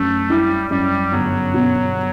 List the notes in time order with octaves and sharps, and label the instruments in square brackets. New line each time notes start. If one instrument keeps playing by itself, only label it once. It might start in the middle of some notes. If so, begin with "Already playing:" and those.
Already playing: [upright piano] F#2 [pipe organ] A3
[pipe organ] G3 [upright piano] E4
[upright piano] F#2 [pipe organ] G3
[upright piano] G1 [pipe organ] F#3
[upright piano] B2